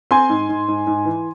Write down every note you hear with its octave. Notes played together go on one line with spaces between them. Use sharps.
C4 G#5 C6
G#2
G#2
G#2
G#2
E3